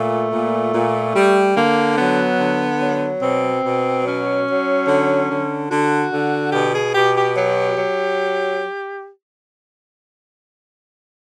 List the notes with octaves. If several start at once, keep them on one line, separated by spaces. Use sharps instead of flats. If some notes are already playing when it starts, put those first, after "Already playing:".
Already playing: A#2 A3
A#2
A#2
G3
D3 A#3
F#3 B3
D3
F#3
B2 C4
B2
F#3 C#4
F#3
D3
D3
D3 F#4
D3
B2 G4
G#4
B2 G4
G4
F#3 G4
F#3